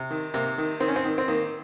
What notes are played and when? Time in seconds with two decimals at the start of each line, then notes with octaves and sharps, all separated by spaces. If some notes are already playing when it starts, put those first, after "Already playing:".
Already playing: C3
0.11 D#3
0.34 C3 A#3
0.58 D#3
0.80 D#3 C4
0.88 C#4
0.96 C4
1.04 D#3
1.18 C4
1.28 D#3 A#3